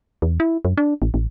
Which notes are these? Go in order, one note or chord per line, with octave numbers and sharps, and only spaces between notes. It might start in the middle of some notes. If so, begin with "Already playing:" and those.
E2
E4
F#2
D4
A1
A1